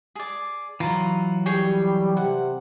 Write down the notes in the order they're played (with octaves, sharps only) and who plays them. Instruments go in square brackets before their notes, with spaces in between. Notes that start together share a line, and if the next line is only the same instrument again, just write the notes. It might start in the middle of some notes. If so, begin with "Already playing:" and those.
[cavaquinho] G#4 D5
[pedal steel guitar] E3 F#3 [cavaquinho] F4 A#5
[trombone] G3 [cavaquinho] G#4 C#5 G5
[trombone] C3 [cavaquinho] F#5